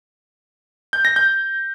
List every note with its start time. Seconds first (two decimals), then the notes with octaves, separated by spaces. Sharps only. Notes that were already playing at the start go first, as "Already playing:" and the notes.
0.93 G6
1.05 A#6
1.16 G6